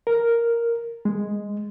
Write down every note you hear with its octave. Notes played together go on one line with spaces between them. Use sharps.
A#4
G#3